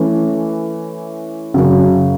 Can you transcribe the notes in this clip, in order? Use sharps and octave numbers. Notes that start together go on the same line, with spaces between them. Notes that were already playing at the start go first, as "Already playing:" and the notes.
Already playing: E3 A3 C#4
F#2 C#3 F#3